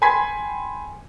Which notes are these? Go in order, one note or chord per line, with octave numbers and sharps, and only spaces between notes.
G5 G#5 B5 C6 G#6 B6